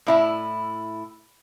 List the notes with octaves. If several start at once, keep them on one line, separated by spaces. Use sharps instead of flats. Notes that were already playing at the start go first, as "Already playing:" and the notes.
A2 E4 E5